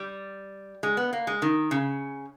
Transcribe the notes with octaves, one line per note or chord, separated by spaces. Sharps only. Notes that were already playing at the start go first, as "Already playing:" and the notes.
Already playing: G3
G#3
B3
A#3
G#3
D#3
C#3